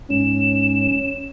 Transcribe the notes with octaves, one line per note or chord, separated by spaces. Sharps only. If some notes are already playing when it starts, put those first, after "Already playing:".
G#2 C#4 E7